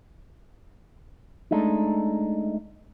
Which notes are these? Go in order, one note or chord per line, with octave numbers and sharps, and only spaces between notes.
G#3 A3 D4 D#4